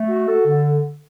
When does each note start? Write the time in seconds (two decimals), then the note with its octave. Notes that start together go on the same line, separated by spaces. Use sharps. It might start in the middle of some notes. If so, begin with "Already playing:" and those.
Already playing: A3
0.09 F#4
0.27 A4
0.46 D3